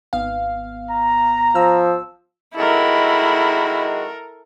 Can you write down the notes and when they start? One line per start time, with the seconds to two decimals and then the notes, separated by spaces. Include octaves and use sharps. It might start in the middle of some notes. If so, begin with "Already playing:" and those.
0.13 G#1 B3 F5
0.91 A#5
1.55 F3 E6
2.56 D#3 G#3 E4 F#4 A4 A#4